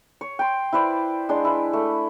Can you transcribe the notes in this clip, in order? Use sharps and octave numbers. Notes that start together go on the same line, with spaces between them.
C#5
G5 C6
E4 B4 C5 D5
G#3 D4 C6
E4 B4
A3